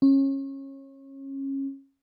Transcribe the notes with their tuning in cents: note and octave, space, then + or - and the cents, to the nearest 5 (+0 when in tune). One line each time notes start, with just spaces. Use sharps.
C#4 -25